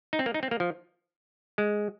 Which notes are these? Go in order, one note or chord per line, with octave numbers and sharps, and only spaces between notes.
D#4
C4
A#3
D#4
C4
A#3
F3
G#3